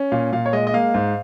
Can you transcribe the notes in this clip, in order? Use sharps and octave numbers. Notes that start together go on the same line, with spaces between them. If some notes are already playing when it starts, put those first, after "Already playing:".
Already playing: C#4
A#2 F5
A#2 F5
C#5
G#3 D#5
D#5
A#3 F5
G#2